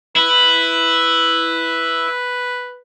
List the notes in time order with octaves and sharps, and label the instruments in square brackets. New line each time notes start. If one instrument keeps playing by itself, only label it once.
[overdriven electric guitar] E4 [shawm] B4